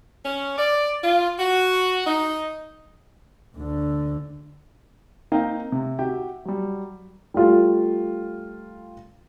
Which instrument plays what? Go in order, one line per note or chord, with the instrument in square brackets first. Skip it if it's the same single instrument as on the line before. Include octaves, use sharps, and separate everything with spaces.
[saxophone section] C#4
D5
F4
F#4
D#4
[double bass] D2 D3
[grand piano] A#3 C4 D#4 D#5 F5 G5
C3
F#4 G4 E5 G5
F#3 G3
[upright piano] G3 A3 F4